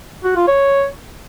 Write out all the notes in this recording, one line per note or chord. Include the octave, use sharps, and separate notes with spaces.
F#4
F4
C#5